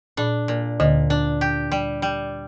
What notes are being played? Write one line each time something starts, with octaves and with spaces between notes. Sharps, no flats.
A#2 D4
A#2
D2 A#2 D3
D4
G4
G3
G3